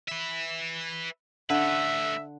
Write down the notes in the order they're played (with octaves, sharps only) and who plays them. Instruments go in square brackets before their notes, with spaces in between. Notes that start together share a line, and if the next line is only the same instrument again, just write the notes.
[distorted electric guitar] B4 E5
[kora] D3 [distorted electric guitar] A3 B4 [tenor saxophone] E5